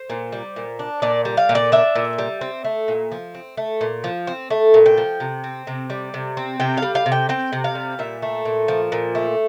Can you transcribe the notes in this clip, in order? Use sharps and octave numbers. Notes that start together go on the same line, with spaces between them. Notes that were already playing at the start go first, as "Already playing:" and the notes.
Already playing: C5
A#2
G3
A#2
D4
A#2 D5
G3
F5
A#2
D5
D4 E5
A#2
G3
C4
A3
A#2
F3
C4
A3
A#2
F3
C4
A3
A#2
G5
F3
C3
C4
C3
G3
C3
C4
C3 G5
F5
G3
F5
C3
G5
C4 G5
C3
F5
G3
A#2 E5
A3
A#2
F3
A#2
A3